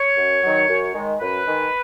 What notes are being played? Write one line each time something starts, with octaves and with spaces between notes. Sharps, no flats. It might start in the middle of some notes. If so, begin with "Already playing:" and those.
Already playing: C#5
F#2
D#3 F#3
F#2
D#3 G#3
F#2 B4
D#3 G#3